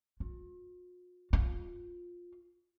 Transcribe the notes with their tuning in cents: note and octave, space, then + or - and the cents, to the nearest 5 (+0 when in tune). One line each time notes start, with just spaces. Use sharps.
F4 +45
F4 +10